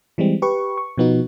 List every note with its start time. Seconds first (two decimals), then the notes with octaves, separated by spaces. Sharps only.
0.18 E3 G3 G#3 C4
0.42 G4 B4 C#6
0.78 C#6
0.98 B2 F3 B3 D#4 F#4